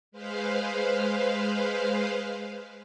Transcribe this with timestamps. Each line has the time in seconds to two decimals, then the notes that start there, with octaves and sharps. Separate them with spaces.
0.12 G#3 B4 C5 F5